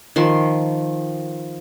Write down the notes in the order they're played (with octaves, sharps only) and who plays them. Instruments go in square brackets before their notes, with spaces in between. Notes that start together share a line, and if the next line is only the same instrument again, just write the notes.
[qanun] D#3 F3 C6